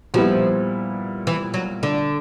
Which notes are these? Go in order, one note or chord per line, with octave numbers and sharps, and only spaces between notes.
A#2 F3 G3 B3 E4
E3
F#3
D3